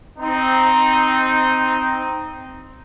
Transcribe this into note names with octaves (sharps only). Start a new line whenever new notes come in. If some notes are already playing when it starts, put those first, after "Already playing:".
C4 D#4